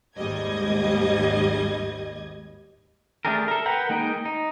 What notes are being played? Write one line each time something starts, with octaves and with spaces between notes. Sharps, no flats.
G#1 D#2 G#2 G3 D#5 G#6
A3 D4 G4 G#4 A#4
A4 A#4
A#4 B4 F#5 G5 A#5
G#3 A#3 D#4 A#4 G5
D#4